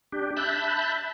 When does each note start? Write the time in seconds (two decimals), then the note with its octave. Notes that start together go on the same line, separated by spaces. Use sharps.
0.12 D4 G4
0.37 E5 A5 B5 F#6 G6